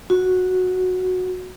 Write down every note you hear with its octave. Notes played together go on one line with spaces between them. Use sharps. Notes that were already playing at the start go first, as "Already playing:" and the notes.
F#4